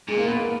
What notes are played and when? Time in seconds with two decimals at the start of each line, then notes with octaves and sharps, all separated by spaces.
0.08 A#2 G#3
0.17 A#3
0.27 B3
0.37 A#3